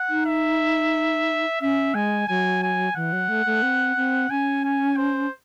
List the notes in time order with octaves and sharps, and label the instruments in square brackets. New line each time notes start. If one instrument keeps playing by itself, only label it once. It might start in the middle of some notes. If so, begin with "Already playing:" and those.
Already playing: [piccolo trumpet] F#5
[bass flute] D#4
[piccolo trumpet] E5
[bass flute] C#4 [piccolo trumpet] E5
[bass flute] G#3 [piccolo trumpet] G#5
[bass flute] F#3 [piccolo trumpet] G#5
[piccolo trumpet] G#5
[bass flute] E3 [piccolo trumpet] F#5
[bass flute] F#3
A3
A3
C4
C4
[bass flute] C#4 [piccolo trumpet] G#5
[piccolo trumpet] G#5
C5